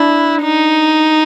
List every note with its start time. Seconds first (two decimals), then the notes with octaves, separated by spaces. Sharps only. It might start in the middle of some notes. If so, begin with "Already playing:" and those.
Already playing: D4 E4
0.42 D#4